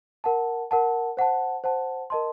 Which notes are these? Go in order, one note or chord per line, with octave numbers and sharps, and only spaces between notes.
A#4 F#5 A5
A#4 F#5 A5
C5 F#5 A5
C5 F#5 A5
A#4 D#5 A5 C6